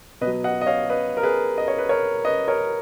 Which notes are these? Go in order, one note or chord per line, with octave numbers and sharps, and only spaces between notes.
B2 F#3 B4 D#5
D#5 F#5
D#5
C#5 F5
B4 D#5
A#4
G#4 B4
D#5
C#5
B4
A#4 C#5
B4 D#5
A#4 C#5